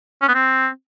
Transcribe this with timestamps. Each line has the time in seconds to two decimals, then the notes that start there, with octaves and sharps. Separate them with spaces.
0.22 C#4
0.28 B3
0.34 C4